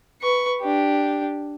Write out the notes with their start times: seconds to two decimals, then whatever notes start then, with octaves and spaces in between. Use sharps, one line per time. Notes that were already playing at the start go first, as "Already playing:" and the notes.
0.22 B4 C#6
0.61 D4 G4